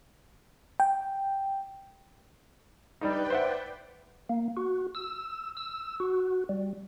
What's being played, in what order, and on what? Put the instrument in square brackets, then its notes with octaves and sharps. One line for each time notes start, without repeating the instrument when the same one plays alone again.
[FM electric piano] G5
[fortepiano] G3 D4 D#4 [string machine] B4 D5 G5
[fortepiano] C5 E5 F#5
[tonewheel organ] A#3
F#4
E6
E6
F#4
G3